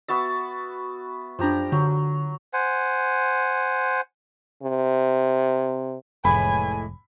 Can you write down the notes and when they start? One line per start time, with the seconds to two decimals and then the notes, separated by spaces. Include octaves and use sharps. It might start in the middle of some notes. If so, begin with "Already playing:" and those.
0.08 B3 F#4 E5 A6
1.39 F#2 F3 D4 G4 A#5
1.72 D3 F#3
2.53 C5 F#5 G#5
4.63 C3
6.25 F1 A2 E3 G#3 G#5 B5